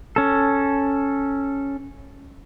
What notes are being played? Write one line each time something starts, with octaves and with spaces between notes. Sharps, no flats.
C#4 A4